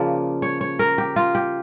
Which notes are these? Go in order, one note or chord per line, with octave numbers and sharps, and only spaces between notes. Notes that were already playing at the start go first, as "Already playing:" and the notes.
Already playing: C#3 F3 A#3 D5
C#5
C#5
A#4
G4
F4
G4